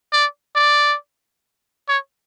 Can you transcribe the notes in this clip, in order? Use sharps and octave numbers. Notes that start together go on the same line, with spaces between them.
D5
D5
C#5